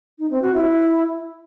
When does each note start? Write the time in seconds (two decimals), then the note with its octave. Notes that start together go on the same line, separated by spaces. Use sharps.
0.19 D#4
0.30 C4
0.42 F#4
0.53 E4